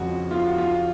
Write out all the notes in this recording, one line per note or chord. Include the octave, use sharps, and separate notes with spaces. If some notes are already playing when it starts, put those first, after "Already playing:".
Already playing: F2 C#3 G#3 F#4
F4
F#4
F4